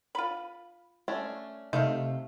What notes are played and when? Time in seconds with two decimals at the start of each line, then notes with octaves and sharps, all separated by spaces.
0.15 F4 B5
1.08 A3 C#4 D4
1.73 C3 A3 D#4 E5 F5